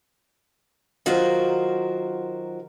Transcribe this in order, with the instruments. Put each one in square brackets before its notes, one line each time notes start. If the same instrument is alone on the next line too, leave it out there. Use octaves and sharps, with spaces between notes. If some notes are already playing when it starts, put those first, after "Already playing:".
[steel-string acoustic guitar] D#3 F#3 F4 F#4 A#4 C5